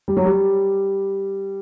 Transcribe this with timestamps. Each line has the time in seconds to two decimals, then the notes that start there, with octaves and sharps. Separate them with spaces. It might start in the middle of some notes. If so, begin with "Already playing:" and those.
0.08 G3
0.17 F#3
0.25 G3